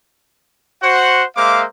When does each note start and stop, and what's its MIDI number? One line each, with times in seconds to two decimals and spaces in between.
0.82 1.23 66
0.82 1.23 72
0.82 1.23 78
1.37 1.63 56
1.37 1.63 58
1.37 1.63 72
1.37 1.63 76
1.37 1.63 77
1.37 1.63 86